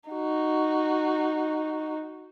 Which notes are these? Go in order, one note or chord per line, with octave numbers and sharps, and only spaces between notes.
D#4 F#4